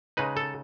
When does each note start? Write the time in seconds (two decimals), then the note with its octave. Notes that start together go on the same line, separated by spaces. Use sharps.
0.17 C#3 G#3 D#4 B4
0.37 A4